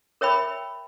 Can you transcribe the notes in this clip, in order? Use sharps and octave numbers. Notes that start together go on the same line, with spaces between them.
A#4 C#5 E5 G5 B5